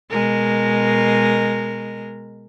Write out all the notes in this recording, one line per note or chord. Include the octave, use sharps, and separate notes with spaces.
B2 G#3 A#4